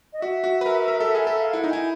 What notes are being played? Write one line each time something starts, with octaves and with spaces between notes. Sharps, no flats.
D#5
F#4 E5
F#4
B4
A#4
A#4
A4
G#4
A4
F5
E4 F#5
D#4
E4 G#5